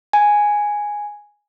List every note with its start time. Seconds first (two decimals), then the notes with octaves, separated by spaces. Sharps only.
0.13 G#5